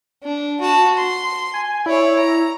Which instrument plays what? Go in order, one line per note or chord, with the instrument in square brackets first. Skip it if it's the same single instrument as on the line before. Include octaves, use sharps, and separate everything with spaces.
[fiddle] D4
F#4 A5
C6
[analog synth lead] G#5
[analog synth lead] E4 [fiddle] C#5 D5
[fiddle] A#5